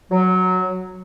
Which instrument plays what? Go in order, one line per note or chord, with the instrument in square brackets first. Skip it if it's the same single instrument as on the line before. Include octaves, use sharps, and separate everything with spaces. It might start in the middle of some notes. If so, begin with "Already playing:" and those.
[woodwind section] F#3